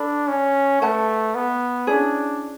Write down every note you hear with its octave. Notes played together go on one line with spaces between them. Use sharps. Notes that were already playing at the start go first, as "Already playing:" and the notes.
Already playing: D4 A4 B5
C#4
A3 B4 F#5 A5
B3
C#4 D4 E4 G#4